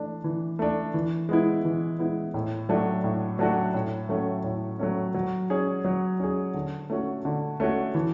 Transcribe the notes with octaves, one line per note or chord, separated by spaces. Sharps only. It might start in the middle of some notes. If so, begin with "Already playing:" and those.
Already playing: E3 A3 D4
E3
A3 D4
E3
G#3 B3 E4
E3
G#3 B3 E4
A2
F#3 A3 D4 F#4
A2
F#3 A3 D4 F#4
A2
F#3 A3 C#4
A2
F#3 A3 C#4
F#3
C#4 G#4
F#3
C#4 G#4
D3
A3 C#4 F#4
D3
A3 C#4 F#4
E3